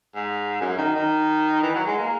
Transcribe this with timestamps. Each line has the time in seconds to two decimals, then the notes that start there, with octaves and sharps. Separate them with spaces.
0.15 G#2
0.61 F#2
0.78 D#3
0.95 D#3
1.63 E3
1.75 F#3
1.86 G#3
1.98 A#3